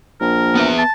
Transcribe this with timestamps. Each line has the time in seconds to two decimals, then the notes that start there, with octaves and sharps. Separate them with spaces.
0.20 A#1 A#4
0.55 B3 B4 E5
0.78 A5